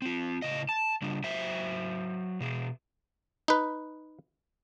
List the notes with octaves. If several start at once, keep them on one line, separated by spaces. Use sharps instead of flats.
C4 F4
A2 C#3 D#5
A5
C#3 G3 D4
F#3 C5 E5
B2 G#4
D#4 B4